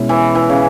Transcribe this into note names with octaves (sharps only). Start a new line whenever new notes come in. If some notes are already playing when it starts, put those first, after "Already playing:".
Already playing: B2 G#3 C#4 E4
E3
E3
C#3